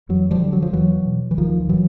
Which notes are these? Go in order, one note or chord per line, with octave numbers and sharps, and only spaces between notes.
F2 E3 F#3
F3 G3
D3
F#3
F3
E2 E3 F#3
B2
E3
D2 D#3 F3
C3 E3 F#3